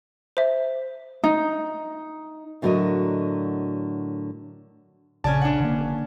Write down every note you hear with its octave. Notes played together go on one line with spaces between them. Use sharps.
C5 E5
D#4
A2 D3 F#3 F#4 A#4 D#5
A#1 C#3 C#4 D5 G#5 A5
D4 F#5
F1 D3 A#3